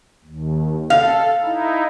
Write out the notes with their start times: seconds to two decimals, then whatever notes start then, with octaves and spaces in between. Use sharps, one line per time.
0.25 D#2
0.90 A4 F5
1.43 D#4 E4